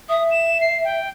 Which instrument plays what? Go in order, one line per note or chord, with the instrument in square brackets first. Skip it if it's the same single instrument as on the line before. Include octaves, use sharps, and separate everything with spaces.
[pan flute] E5 [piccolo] D#6
[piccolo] E7
C7
G5